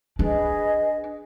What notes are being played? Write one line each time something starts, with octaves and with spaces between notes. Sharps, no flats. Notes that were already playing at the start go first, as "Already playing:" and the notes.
D4 G#4 B4 D#5